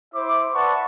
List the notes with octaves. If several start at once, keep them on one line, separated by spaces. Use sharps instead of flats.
E4 C5 E5 D6
B4 D5 E5 F#5 A5 C#6